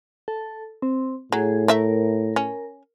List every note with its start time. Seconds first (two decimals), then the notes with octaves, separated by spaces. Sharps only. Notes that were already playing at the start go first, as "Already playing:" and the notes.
0.28 A4
0.82 C4
1.32 A2 F#3 G#4
1.68 A3 A#4 E5
2.36 C#4